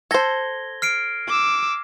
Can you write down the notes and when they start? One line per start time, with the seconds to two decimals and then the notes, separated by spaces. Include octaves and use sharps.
0.11 A4 C5 G#6 A#6 G7
0.82 F6 C7 D7
1.28 D6 E6